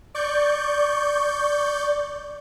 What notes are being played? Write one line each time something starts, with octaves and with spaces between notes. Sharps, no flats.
D5 C#6 G6